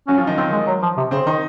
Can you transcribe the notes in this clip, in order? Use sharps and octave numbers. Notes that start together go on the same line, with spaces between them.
F#3 C#4 F#4
F3 F4
D#3 D#4
D#3 C4 D#4
G#3
F#3
F3
C3
C#3 C4 C5
D#3 D#4 D#5